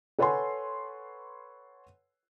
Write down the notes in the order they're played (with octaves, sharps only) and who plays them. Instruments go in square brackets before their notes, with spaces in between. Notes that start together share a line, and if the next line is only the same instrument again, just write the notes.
[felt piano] A4 B4 C#5 F#5 G#5 C6